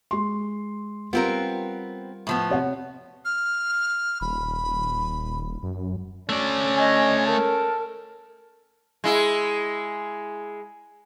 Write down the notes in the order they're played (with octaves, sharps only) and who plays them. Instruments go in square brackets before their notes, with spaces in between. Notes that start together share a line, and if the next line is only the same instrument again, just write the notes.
[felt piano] G#3 C6
[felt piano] G3 F4 [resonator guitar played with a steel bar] B3 C4 A#4
[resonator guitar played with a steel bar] A2 F3 B3
[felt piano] C3 C#5 F#5
[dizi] F6
[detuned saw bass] D#1 [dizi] B5
[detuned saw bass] F#2
[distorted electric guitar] A3 D5 [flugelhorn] C#4
[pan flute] D#5 [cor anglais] G#5
[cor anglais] A4 [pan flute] A#4
[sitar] G#3 E4